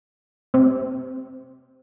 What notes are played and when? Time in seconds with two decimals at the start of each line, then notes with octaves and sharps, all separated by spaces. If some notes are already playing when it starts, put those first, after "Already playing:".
0.54 C3